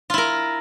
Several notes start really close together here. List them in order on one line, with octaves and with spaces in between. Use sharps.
F4 E4 A#4